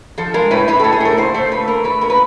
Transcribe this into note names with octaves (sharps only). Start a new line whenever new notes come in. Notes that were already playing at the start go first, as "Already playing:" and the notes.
F3 A4
G#3 A#4
A2 B4
A2 B4
A2 A4
G#4
A2 A#4
A#2 C5
A3 C5
A#2 B4
A3 A#4
A3 B4
A#2 A#4
B4